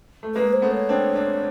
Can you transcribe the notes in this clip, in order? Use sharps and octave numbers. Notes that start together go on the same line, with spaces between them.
A3
G#3 A#3 B4
C5
A3 B3
C#5
C4 D4
C4 D4